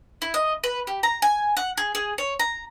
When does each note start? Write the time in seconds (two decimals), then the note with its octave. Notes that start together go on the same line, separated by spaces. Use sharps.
0.22 E4
0.34 D#5
0.64 B4
0.87 G4
1.03 A#5
1.22 G#5
1.57 F#5
1.77 G#4
1.95 G#4
2.18 C#5
2.40 A#5